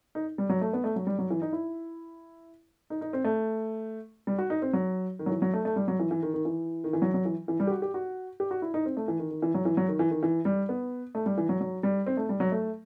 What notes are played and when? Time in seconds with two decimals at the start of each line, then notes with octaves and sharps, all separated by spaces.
0.15 D#4
0.38 G3
0.49 F#3
0.61 A3
0.73 B3
0.84 A3
0.96 F#3
1.07 G3
1.19 F#3
1.30 E3
1.42 D#4
1.53 E4
2.90 D#4
3.01 D#4
3.13 C4
3.24 A3
4.27 G3
4.38 F#4
4.50 D#4
4.62 C4
4.73 F#3
5.19 D#3
5.26 F#3
5.31 E3
5.42 F#3
5.53 A3
5.65 A3
5.76 G3
5.88 F#3
6.00 E3
6.11 E3
6.23 D#3
6.34 D#3
6.45 E3
6.84 D#3
6.93 E3
7.02 F#3
7.14 F#3
7.25 E3
7.48 E3
7.60 G3
7.67 G4
7.71 F#4
7.82 G4
7.94 F#4
8.40 G4
8.51 F#4
8.62 E4
8.74 D#4
8.85 C4
8.97 A3
9.08 E3
9.19 D#3
9.31 D#3
9.42 E3
9.54 F#3
9.65 E3
9.77 F#3
9.88 D#3
9.99 E3
10.11 D#3
10.23 E3
10.45 G3
10.69 B3
11.15 A3
11.26 G3
11.38 E3
11.49 F#3
11.61 F#3
11.83 G3
12.06 C4
12.17 A3
12.29 G3
12.40 F#3
12.52 A3